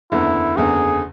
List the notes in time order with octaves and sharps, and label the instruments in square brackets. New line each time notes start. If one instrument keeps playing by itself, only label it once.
[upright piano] F#1 E2 D3 [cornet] E4
[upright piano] F#1 E2 D3 [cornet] G#4